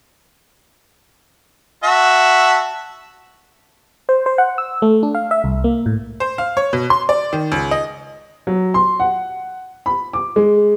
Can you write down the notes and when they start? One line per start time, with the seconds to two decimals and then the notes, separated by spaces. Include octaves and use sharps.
1.84 F#4 E5 A5
4.09 C5
4.26 C5
4.38 F#5
4.58 E6
4.82 A3
5.03 D4
5.15 F5
5.31 E5
5.44 C2
5.64 A#3
5.86 A2
6.20 C5
6.38 F5
6.57 C#5
6.73 B2
6.90 C6
7.09 D5
7.33 D#3
7.52 C#2
7.71 D#5
8.47 F#3
8.74 C6
9.00 F#5
9.86 B5
10.13 D6
10.36 G#3